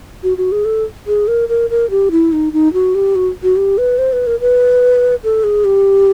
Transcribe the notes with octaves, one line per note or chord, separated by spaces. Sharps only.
F#4
F#4
G#4
A4
G#4
A#4
A#4
A#4
G4
E4
D#4
D#4
F#4
G4
F#4
F#4
G4
B4
C5
B4
A#4
B4
A4
G#4
G4